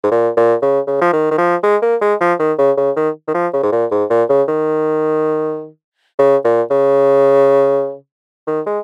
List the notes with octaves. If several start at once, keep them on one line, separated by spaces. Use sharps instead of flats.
G#2
A#2
A#2
C#3
C#3
F3
D#3
D#3
F3
G#3
A#3
G#3
F3
D#3
C#3
C#3
D#3
D#3
F3
C#3
G#2
A#2
G#2
A#2
C#3
D#3
C#3
A#2
C#3
D#3
G#3